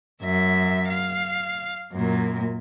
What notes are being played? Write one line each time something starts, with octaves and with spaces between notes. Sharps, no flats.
F#2 E5
F5
F#2 A#2